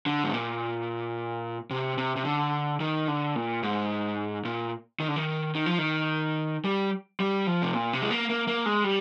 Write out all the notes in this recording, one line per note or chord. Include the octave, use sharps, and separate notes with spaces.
D3
G#2
A#2
C3
C3
C3
D3
D#3
D3
A#2
G#2
A#2
D#3
D3
D#3
D#3
F3
D#3
G3
G3
F3
C3
A#2
C3
G#3
A#3
A#3
A#3
G#3
G3